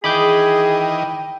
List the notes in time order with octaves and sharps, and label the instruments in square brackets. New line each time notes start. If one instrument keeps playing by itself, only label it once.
[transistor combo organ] D#3 E3 D#5 [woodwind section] G#4 [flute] G5 [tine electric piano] B5 D6 G6